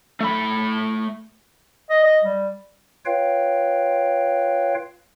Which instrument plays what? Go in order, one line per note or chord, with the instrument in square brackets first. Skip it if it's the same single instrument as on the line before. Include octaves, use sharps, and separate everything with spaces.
[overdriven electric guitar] A3 B5
[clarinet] D#5
D#5
G3
[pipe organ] F4 B4 C#5 F5 G5